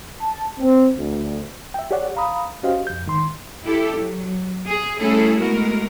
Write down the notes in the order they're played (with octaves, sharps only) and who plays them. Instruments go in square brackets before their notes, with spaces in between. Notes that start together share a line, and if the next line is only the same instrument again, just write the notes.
[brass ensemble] A5
C4
D2
[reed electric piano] E5 G5
G4 G#4 C#5 D5 F#5
F5 A#5 B5 D#6
C#4 F#4 G4 C5 D#5 F5
F2 G6
G#2 D#3 C6
[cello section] E4 G4 A4
F#3
G#4
G3 A3 C#4 E4 G#4 A4
G#3 A3 B3 F#4 A#4